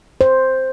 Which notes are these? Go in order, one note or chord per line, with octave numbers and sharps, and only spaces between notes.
C5